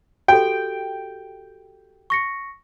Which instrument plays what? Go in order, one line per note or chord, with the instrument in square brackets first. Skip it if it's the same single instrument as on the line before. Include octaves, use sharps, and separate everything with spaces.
[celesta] F#4 G4 A4 [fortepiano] G5
[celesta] C#6 A#6 C#7